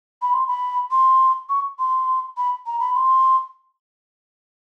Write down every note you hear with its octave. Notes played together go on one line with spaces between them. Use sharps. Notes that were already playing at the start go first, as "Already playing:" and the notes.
B5
C6
B5
C6
C#6
C6
B5
A#5
B5
C6